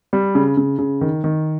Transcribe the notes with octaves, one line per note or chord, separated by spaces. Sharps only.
G3
C#3
C#3
C#3
D#3
D#3